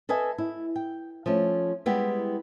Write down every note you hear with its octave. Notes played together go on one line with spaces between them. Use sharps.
A4 B4 D#5 E5 G#5
E4
G5
F3 A3 C#4
G3 G#3 B3 E4 G4